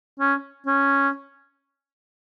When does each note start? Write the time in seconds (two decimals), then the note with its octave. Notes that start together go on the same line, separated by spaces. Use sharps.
0.20 C#4
0.67 C#4